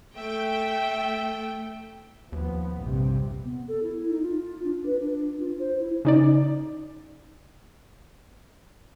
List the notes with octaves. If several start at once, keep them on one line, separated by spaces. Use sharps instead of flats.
A3 E5 G5
D#2 F3 B3
A#1 G2 C3
B3
A4
E4
D#4
F4
D4
B4
D4
F4
C5
E4
C#3 D#4 D5